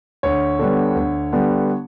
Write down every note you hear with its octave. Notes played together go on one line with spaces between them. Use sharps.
D2 C#5
D3 G3 B3
D2
D3 G3 B3